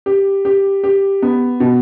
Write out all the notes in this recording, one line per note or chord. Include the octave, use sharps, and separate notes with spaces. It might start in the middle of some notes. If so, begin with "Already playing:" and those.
G4
G4
G4
B3
B2